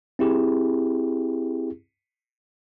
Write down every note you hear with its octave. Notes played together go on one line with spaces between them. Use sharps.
C4 E4 G4 G#4